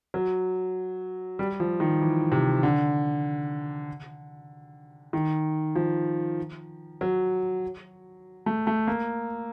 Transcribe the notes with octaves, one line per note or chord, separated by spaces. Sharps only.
F#3
G3
F3
D#3
E3
C3
D3
D#3
F3
F#3
A3
A3
A#3